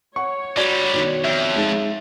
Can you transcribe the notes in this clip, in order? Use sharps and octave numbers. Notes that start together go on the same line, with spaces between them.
C#5 F#5 C#6
D3 G3 F#4 D5 G#6
B2 D#3
F2 E5
G#3 D#4 A6